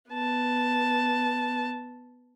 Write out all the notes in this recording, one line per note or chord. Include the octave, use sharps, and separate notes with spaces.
B3 A5